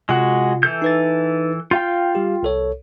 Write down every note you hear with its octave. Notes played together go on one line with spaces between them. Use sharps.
C3 G#3 F4 F#4
E3 A4 G6
D#4 B4 A6
F4 F5 G5 G6
G3 G4
C2 A4 C#5